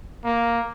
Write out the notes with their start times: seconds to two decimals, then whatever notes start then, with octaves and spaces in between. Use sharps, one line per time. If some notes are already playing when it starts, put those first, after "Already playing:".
0.25 A#3